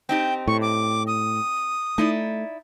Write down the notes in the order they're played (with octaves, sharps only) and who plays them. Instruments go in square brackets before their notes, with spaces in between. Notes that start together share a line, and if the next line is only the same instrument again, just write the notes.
[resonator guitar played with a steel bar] C4 D#4 G4 [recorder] G5
[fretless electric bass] A2 [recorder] C#6
[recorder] D6
D#6
[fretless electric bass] A3 [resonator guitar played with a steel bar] D#4 E4 D5